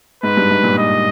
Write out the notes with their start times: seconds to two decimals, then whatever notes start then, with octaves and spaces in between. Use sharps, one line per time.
0.23 G#2 B4
0.37 G2
0.51 G#2
0.63 G2 A#2
0.78 D#5